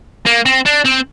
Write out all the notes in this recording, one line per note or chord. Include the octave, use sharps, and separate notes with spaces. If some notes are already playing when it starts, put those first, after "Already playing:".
A#3
C4
D4
C4